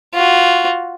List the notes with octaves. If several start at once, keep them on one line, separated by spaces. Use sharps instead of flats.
F4 F#4